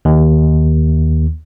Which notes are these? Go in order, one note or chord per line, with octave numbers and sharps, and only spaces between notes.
D#2